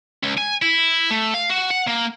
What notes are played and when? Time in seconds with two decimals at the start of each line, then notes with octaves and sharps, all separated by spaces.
0.23 C#2
0.38 G#5
0.62 E4
1.11 A3
1.34 F5
1.50 F#4
1.70 F#5
1.87 A#3